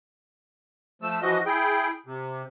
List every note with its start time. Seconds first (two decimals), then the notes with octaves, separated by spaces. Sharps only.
1.02 F3 A3 E6
1.22 E3 F3 F#4 D#5
1.46 E4 G#4 G5
2.06 C3